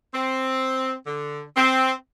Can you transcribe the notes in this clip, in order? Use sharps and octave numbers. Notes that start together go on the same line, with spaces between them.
C4
D3
C4